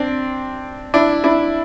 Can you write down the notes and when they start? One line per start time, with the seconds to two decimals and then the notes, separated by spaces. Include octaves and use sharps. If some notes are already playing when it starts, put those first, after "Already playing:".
Already playing: C4 D4
0.94 D4 E4
1.24 D4 E4